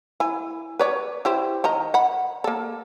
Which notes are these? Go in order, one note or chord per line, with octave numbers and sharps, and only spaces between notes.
E4 G#5
B4 C#5 D5
E4 G4 C5
D#3 D#5 A#5
F#5 B5
A#3 A4